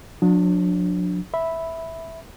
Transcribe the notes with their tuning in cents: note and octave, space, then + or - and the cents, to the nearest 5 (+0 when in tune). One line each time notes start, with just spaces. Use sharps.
F#3 -45 D4 +0
E5 -5 B5 +0